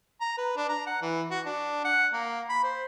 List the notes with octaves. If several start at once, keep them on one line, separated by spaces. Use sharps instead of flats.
A#5
B4
D4
A#5
F#5
E3
F#4
D4
F#5
A#3
B5
C5